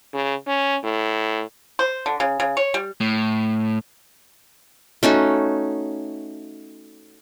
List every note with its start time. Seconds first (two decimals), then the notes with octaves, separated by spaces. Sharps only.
0.14 C#3
0.47 C#4
0.84 A2
1.79 C5
2.06 D3
2.20 C#3
2.40 C#3
2.57 C#5
2.74 G3
3.00 A2
5.03 A3 C#4 D#4 F#4